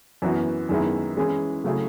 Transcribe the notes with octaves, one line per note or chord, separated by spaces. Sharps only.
F#2 E3 B3 F#4
F#2 D#3 G#3 B3 E4
E3 G#3 C#4 E4 G#4
C#3 F#3 A3 E4 G#4